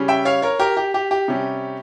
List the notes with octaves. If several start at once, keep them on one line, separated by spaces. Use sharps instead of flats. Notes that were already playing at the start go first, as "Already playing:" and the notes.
Already playing: C#3 G3 C#4
E5 G5
C#5 F5
A#4 C#5
G4 A#4
G4
G4
G4
C3 G3 C#4